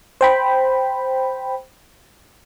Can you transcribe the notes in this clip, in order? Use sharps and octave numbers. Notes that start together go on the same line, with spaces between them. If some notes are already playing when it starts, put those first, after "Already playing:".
C5 G5 B5